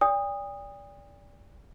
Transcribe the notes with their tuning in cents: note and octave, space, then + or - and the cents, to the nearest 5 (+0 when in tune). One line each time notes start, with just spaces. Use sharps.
D5 -25 G5 +45 D#6 -5